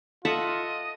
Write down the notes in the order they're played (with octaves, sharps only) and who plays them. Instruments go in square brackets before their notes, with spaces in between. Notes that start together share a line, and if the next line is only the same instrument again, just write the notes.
[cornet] F4 [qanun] A4 E5 F#5 [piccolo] D#5